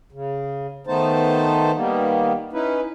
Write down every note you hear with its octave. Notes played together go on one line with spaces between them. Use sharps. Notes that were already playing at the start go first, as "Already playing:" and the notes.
C#3
D#3 A3 B3 D#4 C5 A5
D#3 G3 A#3 B3
C#4 D#4 E4 B4